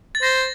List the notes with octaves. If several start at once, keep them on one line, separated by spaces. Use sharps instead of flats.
A6
C5 A#6